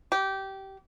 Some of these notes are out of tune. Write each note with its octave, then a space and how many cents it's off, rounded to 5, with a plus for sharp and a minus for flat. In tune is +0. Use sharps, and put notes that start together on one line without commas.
G4 -20